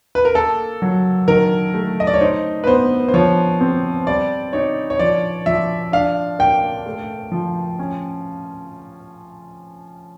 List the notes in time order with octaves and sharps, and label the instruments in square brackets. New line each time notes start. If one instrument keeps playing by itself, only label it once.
[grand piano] B4
A#4
[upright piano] A#3 [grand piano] A4
[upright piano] F#3
[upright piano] D#3 [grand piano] A#4
[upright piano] A3
[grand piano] D#5
D5
C#5
[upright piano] D#4 [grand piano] C5
[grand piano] B4
[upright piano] B3 [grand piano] C5
[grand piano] C5
[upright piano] F3 [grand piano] C#5
[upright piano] C4
[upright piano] G3 [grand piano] D5
[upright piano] D#4 [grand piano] C#5
[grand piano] C#5
[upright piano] F3 [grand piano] D5
[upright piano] F3 [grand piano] E5
[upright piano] D4 [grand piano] F5
[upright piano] A#3 [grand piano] G5
[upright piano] A3
F3
C#4